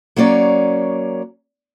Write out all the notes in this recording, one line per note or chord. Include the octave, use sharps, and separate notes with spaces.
F#3 A#3 C#4 D5